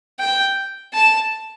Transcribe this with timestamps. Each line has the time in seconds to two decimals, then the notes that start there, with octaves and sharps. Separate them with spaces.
0.20 G5
0.94 A5